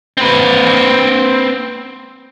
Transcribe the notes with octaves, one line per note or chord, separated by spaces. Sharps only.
C4 B4